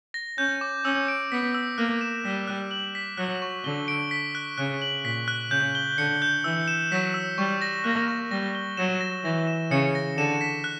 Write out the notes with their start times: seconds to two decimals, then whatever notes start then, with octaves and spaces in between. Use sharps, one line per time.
0.14 A#6
0.38 C#4 G6
0.61 D6
0.84 C#4 E6
1.08 D7
1.32 B3 B6
1.55 E6
1.78 A#3 F#6
2.01 E7
2.25 G3 B6
2.47 F#6
2.71 F#7
2.95 B6
3.17 F#3 F#6
3.42 C#6
3.64 D3 G7
3.88 D7
4.11 B6
4.35 F#6
4.58 C#3 F#6
4.82 F#7
5.04 A#2 B6
5.28 F#6
5.51 C#3 G6
5.75 G7
5.98 D3 C#7
6.22 G6
6.44 E3 E6
6.68 E7
6.92 F#3 B6
7.14 E6
7.38 G3 C#6
7.62 A#6
7.84 A#3 F#6
8.08 C#6
8.31 G3 A#6
8.55 G7
8.77 F#3 E7
9.01 A#6
9.24 E3 A#6
9.47 E7
9.71 C#3 C#7
9.95 A#6
10.17 D3 E7
10.41 B6
10.64 F#6